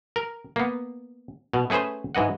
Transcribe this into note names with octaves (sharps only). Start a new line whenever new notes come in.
A#4
A#3 B3
B2
A3 C#4 G#4 B4 C5
G#2 E3 D#5 F#5